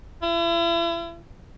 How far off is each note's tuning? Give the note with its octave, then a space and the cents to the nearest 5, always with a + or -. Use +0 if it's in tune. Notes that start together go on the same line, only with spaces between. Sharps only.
E4 +40